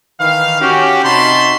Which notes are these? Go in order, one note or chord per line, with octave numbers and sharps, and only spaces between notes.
D#3 E3 B4 F5
C#4 F#4 G4
C3 D#4 F#4 A5 B5 C6